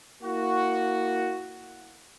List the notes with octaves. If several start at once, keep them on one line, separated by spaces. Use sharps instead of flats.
A#3 E4 F#4